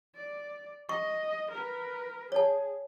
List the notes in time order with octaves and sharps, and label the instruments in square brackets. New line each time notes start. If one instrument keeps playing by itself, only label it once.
[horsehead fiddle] D5
[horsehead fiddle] D#5 [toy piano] C#6
[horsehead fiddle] A#4 B4
[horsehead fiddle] G#4 [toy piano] C#5 A5